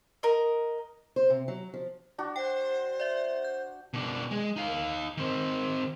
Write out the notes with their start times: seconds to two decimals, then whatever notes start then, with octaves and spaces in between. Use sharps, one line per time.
0.23 A#4 D#5
1.16 C5
1.30 C3
1.48 F#3
1.74 F3
2.18 D4 F#4
2.36 C5 G5
3.00 D5 E5
3.44 G6
3.94 B2 D4
4.31 G#3
4.56 D#4 F5
5.17 D#3 C4